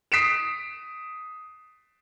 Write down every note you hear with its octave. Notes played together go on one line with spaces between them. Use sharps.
D#6 B6 C7 D7 E7